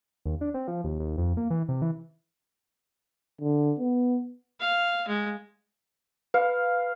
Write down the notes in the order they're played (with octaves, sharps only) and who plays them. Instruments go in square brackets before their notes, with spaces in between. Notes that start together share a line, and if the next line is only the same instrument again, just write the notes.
[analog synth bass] D#2
D4
C4
F3
D#2
D#2
F2
A#3
E3
C3
E3
[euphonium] D3
B3
[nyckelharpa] F5
G#3
[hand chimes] B4 [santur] F5